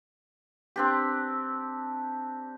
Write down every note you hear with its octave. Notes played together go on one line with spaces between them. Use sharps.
C4 D4 G4